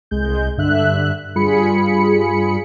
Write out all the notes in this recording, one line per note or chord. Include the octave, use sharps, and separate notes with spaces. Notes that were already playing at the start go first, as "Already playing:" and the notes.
C2 G#3 G6
G2 D3 E5 F#6
G2 G3 F4 G#4 B5 C#7